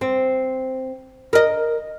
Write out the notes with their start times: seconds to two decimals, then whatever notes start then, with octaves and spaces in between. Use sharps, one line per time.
0.01 C4
1.33 A#4 D#5